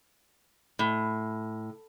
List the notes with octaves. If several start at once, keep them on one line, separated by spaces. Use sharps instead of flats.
A2